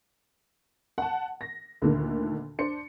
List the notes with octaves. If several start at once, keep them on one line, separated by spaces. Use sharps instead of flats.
F#5 A5
A#6
D2 A#2 D3 D#3
D4 C5 C#7